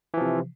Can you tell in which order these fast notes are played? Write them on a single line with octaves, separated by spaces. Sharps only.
E3 F3 C3